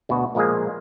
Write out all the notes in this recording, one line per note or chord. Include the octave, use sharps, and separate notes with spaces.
D2 B2 B3 F#4
A#2 F3 G#3 A#3 G#4